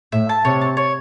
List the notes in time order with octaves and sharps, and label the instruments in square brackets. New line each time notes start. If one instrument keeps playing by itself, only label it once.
[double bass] A2 [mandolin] E5
[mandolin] A5
[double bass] C3 [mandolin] C#5
[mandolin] A5
C#5